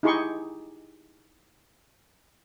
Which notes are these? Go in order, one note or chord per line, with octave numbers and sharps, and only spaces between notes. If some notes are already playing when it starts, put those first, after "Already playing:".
D#4 E4 G4 G#4 C6 C#6